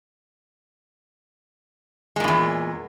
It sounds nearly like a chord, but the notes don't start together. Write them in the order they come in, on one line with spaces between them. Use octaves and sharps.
G#3 A#2 G2 E2